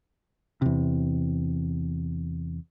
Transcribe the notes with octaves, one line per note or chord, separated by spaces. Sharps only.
E2 C3